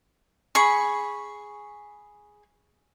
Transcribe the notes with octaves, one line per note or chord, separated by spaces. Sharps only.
G#4 B5 C#6